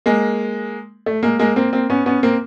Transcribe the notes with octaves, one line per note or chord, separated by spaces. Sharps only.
G#3 A#3
A3
G#3 A#3
G#3 A#3
A#3 C4
A#3 C4
B3 C#4
B3 C#4
A#3 C4